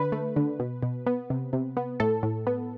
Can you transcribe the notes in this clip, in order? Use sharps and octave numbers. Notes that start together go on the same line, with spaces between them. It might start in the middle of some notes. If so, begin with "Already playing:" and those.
Already playing: D3 B4
A3
D3
B2
B2
B3
C3
C3
B3
A2 A4
A2
B3